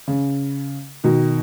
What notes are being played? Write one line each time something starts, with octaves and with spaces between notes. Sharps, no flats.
C#3
B2 D#3